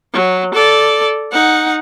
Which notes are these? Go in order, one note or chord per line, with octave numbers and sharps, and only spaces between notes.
F#3
A4 D5
D#4 F#5